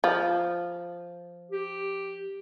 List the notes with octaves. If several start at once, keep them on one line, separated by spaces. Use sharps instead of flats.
F3
G4